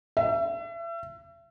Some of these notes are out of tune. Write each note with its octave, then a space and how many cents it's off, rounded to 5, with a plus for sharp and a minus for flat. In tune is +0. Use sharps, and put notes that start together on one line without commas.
E5 +35